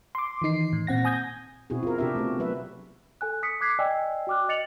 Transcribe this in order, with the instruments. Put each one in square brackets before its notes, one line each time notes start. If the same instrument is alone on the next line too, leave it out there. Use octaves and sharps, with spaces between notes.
[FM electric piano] C6 D6
D#3 E3 D#4 C7
A2
A#2 C4 F#5 A#6
G#5 D#6 G6 G#6 A#6
[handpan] B2 C4 E4 F#4 G#4
F4 A#4
C3 C4 D4 G4 A#4 E5
A3 B3 F#4
F#3 B4 E5
[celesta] A4 G#5 F#6
D#6 B6 C#7
D6 F#6 G#6 B6 C7
D5 D#5 G5 G#5 E6
F#4 G5 D6 F6 F#6
D#5 A6 C#7 F7 F#7